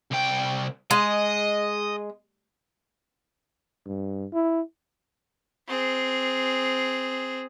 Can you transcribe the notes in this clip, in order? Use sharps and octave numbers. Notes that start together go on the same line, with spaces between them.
C2 G5
G#3 D#5
G2
E4
C4 G#4